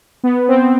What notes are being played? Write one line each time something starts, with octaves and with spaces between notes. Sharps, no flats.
B3
C4